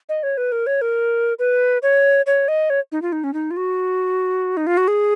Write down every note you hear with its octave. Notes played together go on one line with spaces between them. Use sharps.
D#5
C#5
B4
A#4
C#5
A#4
B4
C#5
C#5
D#5
C#5
D#4
F4
D#4
C#4
D#4
F4
F#4
D#4
F4
F#4
G#4